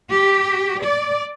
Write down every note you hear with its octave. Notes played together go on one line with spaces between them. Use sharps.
G4
D5